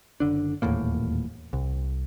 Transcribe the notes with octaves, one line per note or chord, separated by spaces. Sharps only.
F#1 D3 D4
D#1 E2 A2 A#3
C2